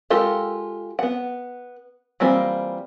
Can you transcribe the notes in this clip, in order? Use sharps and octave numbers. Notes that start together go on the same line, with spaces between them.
G#3 F4 G4 A4 A#4
B3 F#5
E3 G3 A#3 C4 F4